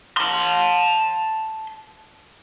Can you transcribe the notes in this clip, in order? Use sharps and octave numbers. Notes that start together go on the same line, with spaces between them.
A5 C6